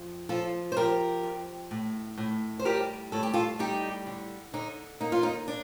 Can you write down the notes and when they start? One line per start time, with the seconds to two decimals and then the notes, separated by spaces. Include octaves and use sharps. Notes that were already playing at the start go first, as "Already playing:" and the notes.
Already playing: F2
0.29 F3 F4 A4
0.72 C5
0.77 F3 G4 A#4
1.23 F2
1.71 A2
2.17 A2
2.59 C5
2.65 G3 G4 A#4
3.12 A2 A4
3.23 G4
3.33 F4 A4
3.59 G3 D#4 G4
4.06 D3
4.54 D3 D#4
5.00 A#3 D#4
5.12 F4
5.23 D#4
5.48 D4